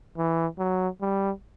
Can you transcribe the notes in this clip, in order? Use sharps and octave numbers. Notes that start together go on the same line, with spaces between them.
E3
F#3
G3